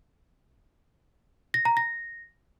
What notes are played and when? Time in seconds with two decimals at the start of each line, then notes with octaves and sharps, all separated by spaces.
1.54 A#6
1.65 A#5
1.77 A#6